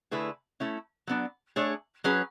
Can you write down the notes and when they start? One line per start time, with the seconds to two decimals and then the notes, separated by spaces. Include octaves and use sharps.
0.11 D3 A3 E4 G#4 B4
0.60 A3 C#4 E4
1.07 F#3 B3 D4
1.56 A3 D4 G#4 C#5
2.04 F#3 C#4 G#4 B4